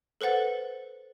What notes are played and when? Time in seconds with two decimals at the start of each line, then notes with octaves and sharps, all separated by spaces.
0.21 A4 B4 C5 F#5 A6